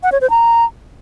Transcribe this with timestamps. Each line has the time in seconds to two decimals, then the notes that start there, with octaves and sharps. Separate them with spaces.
0.03 F#5
0.12 C#5
0.21 C5
0.30 A#5